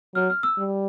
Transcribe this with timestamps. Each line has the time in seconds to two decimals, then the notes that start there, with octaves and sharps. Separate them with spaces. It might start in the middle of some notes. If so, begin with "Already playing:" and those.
0.15 F#3 F6
0.30 F6
0.43 E6
0.58 G3